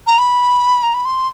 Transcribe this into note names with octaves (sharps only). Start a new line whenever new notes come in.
A#5
B5
A#5
B5
C6